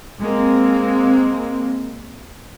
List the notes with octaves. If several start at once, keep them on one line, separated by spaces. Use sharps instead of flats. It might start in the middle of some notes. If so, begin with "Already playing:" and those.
G#3 A#3 C4